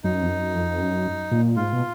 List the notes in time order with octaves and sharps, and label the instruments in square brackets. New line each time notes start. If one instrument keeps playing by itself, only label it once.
[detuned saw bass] F#2 [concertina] D#4
[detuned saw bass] F2
F#2
F2
F#2
A#2
[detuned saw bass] G#2 [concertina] F4
[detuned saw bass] B2